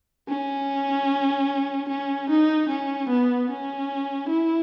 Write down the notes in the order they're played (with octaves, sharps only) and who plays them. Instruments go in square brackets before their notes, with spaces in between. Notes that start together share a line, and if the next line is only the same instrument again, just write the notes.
[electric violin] C#4
C#4
D#4
C#4
B3
C#4
E4